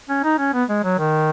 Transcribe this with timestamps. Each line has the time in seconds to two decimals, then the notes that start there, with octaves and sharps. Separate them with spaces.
0.09 C#4
0.23 D#4
0.39 C#4
0.54 B3
0.69 G#3
0.84 F#3
0.99 D#3